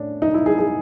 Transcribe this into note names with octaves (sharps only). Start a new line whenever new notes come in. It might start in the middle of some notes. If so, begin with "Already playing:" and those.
Already playing: A2 C#4 D4
D#4
E4
G#4
G#4